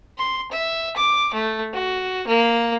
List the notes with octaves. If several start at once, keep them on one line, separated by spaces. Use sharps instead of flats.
C6
E5
D6
A3
F#4
A#3